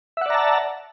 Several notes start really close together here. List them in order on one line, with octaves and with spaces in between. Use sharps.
E5 F#5 D5 A#5 A5